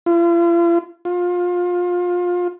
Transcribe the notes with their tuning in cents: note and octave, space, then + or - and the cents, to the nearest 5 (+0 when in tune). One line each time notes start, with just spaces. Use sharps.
F4 -45
F4 +25